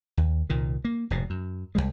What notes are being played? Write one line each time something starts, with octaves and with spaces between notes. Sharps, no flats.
D#2
C2 A#2 D#3
A#3
F1 G#2 B2
F#2
C2 F#2 G3 G#3